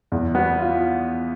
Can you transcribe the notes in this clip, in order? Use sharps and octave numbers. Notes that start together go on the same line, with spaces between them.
E2
B3
F4